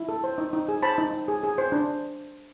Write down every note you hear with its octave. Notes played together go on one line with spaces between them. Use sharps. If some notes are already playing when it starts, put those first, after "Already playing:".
Already playing: E4
A4
C5
D#4
D#4
G#4
C5 A5 B5
D#4
D#4
G#4
G#4
C5
D4